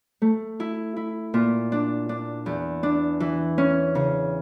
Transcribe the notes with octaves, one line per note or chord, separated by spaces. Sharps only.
A3
E4
E4
A#2
D4
D4
E2
D4
E3
C#4
C#3